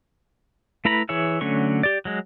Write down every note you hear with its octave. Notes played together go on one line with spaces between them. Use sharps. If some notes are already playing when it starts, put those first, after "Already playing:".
A3 E4 B4 A#5 B5
E3 E4 G#4 C#5 E5
D3 F#3 A3 C#4 C#6
G4 D5
F#3 G#3